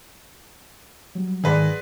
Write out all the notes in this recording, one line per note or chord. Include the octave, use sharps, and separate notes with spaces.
F#3 G3
G#2 D#3 G#4 B4 D5 F#5 C6 A#6